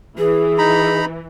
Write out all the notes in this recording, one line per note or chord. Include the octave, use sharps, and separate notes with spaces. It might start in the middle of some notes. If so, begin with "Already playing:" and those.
E3 G#4
D#4 A#5 B5